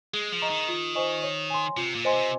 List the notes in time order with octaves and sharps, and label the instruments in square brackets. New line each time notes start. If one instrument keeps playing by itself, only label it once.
[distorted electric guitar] G#3 [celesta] G#4
[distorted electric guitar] F3
[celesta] D#5 A#5 C#6
[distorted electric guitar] D#3
[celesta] F4
C5 D#5 G#5 C#6
C#5
G#5 C6
[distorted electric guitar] C3 [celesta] F4
[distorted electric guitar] A#2
[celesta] C5 D#5 G#5 C6
[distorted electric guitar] C3